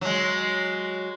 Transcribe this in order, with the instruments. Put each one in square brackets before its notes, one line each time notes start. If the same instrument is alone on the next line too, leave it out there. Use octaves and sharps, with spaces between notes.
[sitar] F#3 G#3